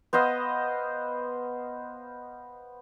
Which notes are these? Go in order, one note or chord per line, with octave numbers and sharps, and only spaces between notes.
B3 C5 D#5 F5